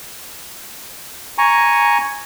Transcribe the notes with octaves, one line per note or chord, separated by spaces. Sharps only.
G#5 A#5 C#6